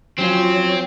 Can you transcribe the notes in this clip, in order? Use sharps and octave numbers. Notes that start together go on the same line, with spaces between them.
F3 F#3 C4 C#4 F4 C#5